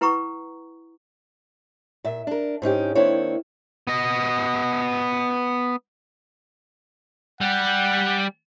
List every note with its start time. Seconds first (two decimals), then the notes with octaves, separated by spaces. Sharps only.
0.01 E4 B4 F#5 A#5 C#6 D#6
2.04 A#2 E5
2.27 D4 A#4
2.62 G#2 C#4 D#4 G4
2.95 D#3 A#3 C4 D4 E4 C#5
3.87 B3 D#5
7.41 G3 G4 F#5